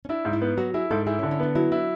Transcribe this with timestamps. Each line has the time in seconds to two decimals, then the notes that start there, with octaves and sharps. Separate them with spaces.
0.05 C#4
0.09 D4 E4
0.25 G#2
0.33 E4
0.41 B3
0.57 F#3 F#4
0.74 E4 G#4
0.91 G#2 A4
1.07 E4 G#4
1.19 C#4
1.23 D3
1.31 C#4
1.40 B3 D4
1.55 F#3 E4
1.72 D4 E4